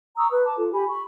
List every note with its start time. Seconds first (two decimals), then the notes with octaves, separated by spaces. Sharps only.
0.17 A#5 C#6 D#6 E6
0.32 B4
0.45 A5 D6
0.58 F4 A4
0.72 G4 G#5 B5
0.89 B5 C#6